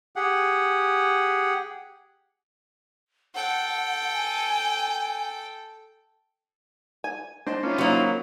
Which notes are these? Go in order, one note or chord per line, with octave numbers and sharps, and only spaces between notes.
G4 G#4 F#5
A4 F#5 G5
G#5
G#5
D4 C5 D#5 A5
D#3 A#3 C#4 E4 F4
F#3 A#3 C4 D#4